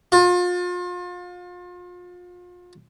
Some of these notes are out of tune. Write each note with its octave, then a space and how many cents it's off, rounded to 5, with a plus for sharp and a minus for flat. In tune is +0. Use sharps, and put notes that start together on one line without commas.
F4 +35